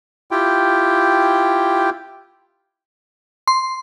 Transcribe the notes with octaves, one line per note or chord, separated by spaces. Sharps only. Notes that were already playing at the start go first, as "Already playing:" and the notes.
E4 F4 G4 G5
C6